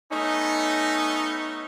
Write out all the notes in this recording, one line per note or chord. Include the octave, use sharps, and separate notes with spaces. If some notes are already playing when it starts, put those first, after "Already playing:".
A3 B3 C#4 D#4